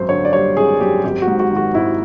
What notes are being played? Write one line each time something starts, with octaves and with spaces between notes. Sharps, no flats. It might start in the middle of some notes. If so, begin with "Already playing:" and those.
Already playing: G#1 F#2 C5
D3 C#5
D5
G3 C#5
G#1 G#4
F#2 G4
G#1 G4
F#4
G#2
F#4
D#3
F#4
G#1 E4